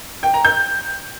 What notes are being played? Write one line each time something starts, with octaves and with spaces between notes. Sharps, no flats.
G5
A#5
G6